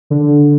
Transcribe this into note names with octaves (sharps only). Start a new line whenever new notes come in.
D3